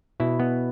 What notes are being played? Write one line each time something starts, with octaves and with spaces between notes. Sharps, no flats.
B2 E4
B3